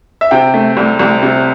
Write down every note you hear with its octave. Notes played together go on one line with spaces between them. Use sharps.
E5
C3 G5
A3
C2
C2
C3